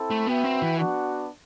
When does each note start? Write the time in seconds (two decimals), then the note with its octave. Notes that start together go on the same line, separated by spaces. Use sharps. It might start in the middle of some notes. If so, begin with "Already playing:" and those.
Already playing: C4 E4 A4
0.11 A3
0.27 B3 F#4 B4 E5 G5
0.44 C4
0.62 E3
0.78 B3 D4 F#4